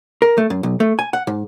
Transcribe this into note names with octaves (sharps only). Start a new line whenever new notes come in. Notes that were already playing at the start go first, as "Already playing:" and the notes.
A#4
A3
F#2
B1
A3
G#5
F#5
G#2